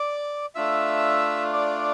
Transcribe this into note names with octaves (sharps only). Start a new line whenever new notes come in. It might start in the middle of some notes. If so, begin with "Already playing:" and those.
Already playing: D5 D6
A3 D4 F4 E5 E6
D5 D6